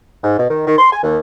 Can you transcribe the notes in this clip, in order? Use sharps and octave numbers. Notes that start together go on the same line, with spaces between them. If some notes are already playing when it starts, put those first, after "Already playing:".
G#2
B2
D#3
D#3
C6
G#5
D#2